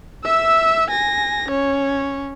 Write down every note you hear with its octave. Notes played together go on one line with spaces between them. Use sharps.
E5 E6
G#5 A#6
C#4 C#5